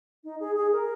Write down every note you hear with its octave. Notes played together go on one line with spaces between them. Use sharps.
D#4
G#4
G#4
A#4